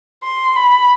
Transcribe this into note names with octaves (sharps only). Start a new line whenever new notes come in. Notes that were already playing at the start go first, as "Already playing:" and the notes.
C6
B5